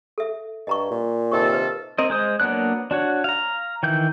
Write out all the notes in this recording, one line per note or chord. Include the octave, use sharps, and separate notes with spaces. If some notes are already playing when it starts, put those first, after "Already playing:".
A4 E5
G2 D#5 A#5 C#6
A#2
C3 D#3 A4 C#6
B4 C5
C4 A#4 D#5
G#3 C5 D#6
F#3 A#3 B3 D4 F#6
D4 F#4 C#5
F5 A#5
D#3 E3 G6